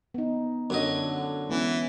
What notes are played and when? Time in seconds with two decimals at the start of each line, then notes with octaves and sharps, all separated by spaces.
0.14 B3 D#4
0.70 F#2 D3 F#3 D#5
1.49 E3 G#3 B3 C#4